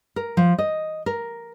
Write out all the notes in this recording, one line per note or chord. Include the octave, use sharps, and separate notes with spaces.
A#4
F3
D#5
A#4